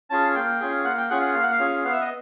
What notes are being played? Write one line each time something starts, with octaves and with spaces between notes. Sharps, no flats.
C#4 F4 G#4 A5
A#3 G5
C#4 F4 G#4
A#3 F#5
G5
C#4 F4 G#4 F#5
F#5
A#3 F5
F#5
F5
C#4 F4 G#4
B3 F5
E5
D#5